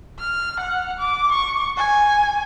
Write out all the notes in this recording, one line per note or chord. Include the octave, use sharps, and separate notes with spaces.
F6
F#5
D6
C#6
G#5